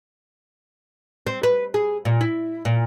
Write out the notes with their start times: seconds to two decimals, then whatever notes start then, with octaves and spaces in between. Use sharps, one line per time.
1.27 C4
1.43 B4
1.74 G#4
2.05 A#2
2.21 E4
2.65 A#2